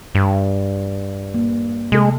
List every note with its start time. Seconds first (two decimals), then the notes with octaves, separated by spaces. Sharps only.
0.15 G2
1.34 A#3
1.92 C3 G#3 A4